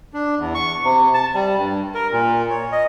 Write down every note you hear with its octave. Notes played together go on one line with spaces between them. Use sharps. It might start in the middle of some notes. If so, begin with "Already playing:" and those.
D4
E2
C#6
C3
A5
G3
G2
A#4
A#2
C#5
D#5